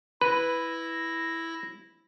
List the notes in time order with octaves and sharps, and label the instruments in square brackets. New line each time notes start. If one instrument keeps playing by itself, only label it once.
[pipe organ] E4 A#6 [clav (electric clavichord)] B4